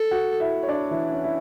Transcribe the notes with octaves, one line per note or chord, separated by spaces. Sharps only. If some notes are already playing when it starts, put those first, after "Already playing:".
Already playing: A4
F#4 F#5
E4 E5
C#5
D4 D5
E3 E4
C#4
E4